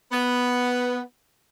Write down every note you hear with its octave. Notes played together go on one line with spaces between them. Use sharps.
B3